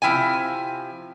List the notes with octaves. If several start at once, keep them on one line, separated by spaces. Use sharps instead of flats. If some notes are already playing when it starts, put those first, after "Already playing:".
C3 F3 E4 G5 G#5